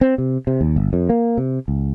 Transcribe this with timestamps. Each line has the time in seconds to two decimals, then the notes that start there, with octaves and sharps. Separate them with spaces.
0.01 C4
0.18 C3
0.47 C3
0.61 D#2
0.76 G1
0.93 F2
1.09 A#3
1.37 C3
1.68 C#2